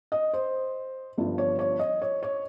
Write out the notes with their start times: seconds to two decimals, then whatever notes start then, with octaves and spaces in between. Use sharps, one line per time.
0.12 D#5
0.33 C5
1.18 G1 G2 F3
1.38 C#5
1.59 C#5
1.79 D#5
2.02 C#5
2.23 C#5